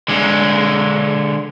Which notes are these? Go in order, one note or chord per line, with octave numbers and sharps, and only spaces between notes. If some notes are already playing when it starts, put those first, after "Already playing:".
D3 G#3